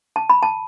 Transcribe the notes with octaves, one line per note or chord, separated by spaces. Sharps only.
A5
B5
A5